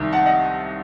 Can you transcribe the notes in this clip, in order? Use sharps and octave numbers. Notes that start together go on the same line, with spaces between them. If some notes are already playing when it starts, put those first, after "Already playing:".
Already playing: C2 C3 D#3
F#5 A5
D#5 F#5